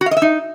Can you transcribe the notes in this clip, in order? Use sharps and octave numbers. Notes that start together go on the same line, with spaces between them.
F#4
F5
D#5
E5
D#4